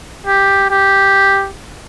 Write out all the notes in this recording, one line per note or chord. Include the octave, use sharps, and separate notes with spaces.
G4
G4